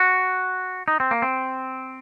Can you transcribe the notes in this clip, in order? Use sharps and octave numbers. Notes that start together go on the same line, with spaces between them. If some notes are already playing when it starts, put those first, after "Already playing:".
Already playing: F#4
D#4
C4
A#3
C4